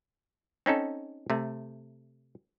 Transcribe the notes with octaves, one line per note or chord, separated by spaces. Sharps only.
C4 C#4 D#4 A4
C3 A3